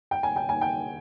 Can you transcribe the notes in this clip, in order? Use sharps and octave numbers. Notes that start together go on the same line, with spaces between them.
G5
G#5
G5
G#5
G5